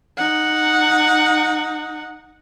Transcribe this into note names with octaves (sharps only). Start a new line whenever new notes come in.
D#4 F#5